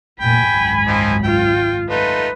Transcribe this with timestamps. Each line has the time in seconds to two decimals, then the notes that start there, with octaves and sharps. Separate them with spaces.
0.21 F1 A#2 G5 G#5 B5
0.52 G#1 C#2 F#2
0.87 F3 C4 D#4
1.24 F4 G5
1.90 A3 D#4 F4 B4